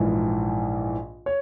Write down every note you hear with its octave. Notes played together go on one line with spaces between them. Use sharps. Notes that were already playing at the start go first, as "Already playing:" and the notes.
Already playing: A#1 G#2 E3
C#5